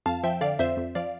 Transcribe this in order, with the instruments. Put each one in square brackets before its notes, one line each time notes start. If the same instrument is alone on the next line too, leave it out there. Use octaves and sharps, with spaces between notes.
[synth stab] F2 F5 A5
F3 E5 G5
D3 D5 F5
F2 C5 E5
F2
F3 D5 F5